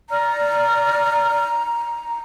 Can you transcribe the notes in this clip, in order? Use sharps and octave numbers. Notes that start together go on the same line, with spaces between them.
D5 A#5 F6